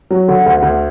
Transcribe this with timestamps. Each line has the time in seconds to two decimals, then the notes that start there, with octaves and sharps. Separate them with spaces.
0.11 F#3
0.28 D3
0.46 D2
0.62 D2